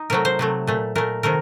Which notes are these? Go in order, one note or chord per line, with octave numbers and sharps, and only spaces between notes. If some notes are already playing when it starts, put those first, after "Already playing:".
Already playing: D#4
C3 F#3 A3 A#4
C5
C3 F#3 A3
A#2 A3
A#2 A3 A#4
C3 D#3 A3 A#4